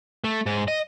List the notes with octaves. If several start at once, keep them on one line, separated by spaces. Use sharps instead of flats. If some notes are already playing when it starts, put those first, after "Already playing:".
A3
G#2
D#5